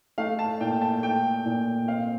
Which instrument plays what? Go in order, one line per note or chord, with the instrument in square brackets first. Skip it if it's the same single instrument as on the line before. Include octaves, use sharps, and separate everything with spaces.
[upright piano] A3 F5
A5
A#2 G5
A5
A3 G5
A#2
C4 F5